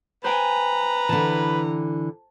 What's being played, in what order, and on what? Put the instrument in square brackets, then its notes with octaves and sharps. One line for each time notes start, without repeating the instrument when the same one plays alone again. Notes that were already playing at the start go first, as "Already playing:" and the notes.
[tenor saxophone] B4 [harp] C5 G5 G#5 [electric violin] A#5
[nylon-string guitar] D3 E3 [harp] A5